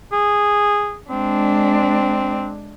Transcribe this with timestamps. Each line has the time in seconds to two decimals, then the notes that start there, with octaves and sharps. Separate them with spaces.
0.12 G#4
1.11 G#3 C4 D4